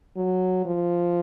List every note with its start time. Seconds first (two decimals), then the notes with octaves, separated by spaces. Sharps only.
0.16 F#3
0.65 F3